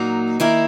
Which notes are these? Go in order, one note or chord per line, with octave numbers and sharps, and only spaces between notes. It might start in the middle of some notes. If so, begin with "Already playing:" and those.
Already playing: A#2 F#3 A#3 D#4
D#3 A#3 E4 A#4